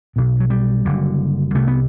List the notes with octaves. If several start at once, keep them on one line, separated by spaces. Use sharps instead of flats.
B1 B2
F#3
G3
F#1 F#2 D3
C2 C3 A3
B3